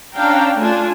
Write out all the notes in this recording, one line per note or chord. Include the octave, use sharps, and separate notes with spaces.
C#4 D4 F5 G5 A#5
A3 D4 F4 G#5